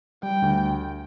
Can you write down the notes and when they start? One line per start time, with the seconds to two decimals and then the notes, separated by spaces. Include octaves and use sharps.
0.23 G3 G5
0.42 D2